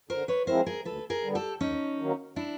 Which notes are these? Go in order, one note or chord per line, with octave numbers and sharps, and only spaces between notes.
D3 A#4 C5
B4 C#5
F3 G#3 C4 E4 A#4 C5
G#4 A#4
D2 A4 B4
G#4 A#4
D3 G3 B3
G4 A4
D#2 C#4 D#4
D#3 F#3 A#3
D4 E4